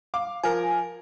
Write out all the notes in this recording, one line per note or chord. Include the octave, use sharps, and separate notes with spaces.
F5 D6
F3 A#4 G#5